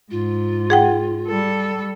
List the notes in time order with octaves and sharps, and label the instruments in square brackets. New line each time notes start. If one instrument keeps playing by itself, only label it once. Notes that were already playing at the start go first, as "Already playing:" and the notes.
[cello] G#2 [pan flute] F4
[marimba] G#4 F#5 G5
[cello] G3 A4